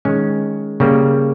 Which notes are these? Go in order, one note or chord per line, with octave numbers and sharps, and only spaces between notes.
D#3 G#3 C#4
C#3 G3 A#3